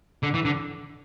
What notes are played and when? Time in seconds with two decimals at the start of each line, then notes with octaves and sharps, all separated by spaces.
0.23 D3
0.34 E3
0.45 D3